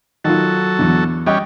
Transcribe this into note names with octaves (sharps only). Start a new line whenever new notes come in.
D#3 F#3 F4 A4
E2 D3
G3 C#4 D#5 G5 F#6